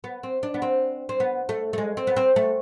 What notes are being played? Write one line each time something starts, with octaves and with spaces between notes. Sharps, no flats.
B3
C4
D4
B3
C4
C4
B3
A3
A3
G#3
C4
B3
C4
A3